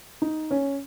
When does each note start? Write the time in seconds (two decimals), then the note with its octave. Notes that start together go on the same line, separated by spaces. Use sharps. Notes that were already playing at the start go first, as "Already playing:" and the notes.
0.22 D#4
0.51 C#4